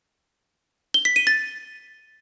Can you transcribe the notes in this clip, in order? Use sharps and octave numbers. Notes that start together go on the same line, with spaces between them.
G7
B6
D#7
A6